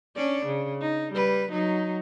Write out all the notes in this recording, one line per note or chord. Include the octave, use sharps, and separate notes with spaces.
C#4 D4 D5
C#3
D#4
G3 B4
F#3 D#4